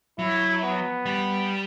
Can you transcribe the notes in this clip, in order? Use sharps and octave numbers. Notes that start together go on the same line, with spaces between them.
F#3 E4
B3
G3